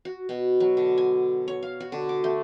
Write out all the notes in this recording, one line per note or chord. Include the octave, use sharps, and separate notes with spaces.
F#4
B2
F#3
D3
G#5
C#5
F5
F#4
D3
D6
A3